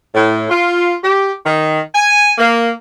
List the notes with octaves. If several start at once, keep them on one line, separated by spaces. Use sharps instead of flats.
A2
F4
G4
D#3
G#5
A#3